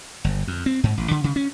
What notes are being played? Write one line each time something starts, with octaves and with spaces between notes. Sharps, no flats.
G1
F2
C4
G#2
A1
D3
C#3
C#4